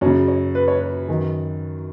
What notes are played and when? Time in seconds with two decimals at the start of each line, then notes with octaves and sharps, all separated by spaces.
0.01 F#2 C#3 C#5
0.28 C#5
0.55 B4
0.68 C#5
0.81 B4
1.08 F#2 D#3